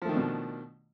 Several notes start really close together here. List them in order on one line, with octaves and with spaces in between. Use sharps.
F3 A3 D#3 D4 B2